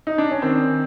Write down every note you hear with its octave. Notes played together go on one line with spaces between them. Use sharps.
D#4
D4
C#4
D#3 C4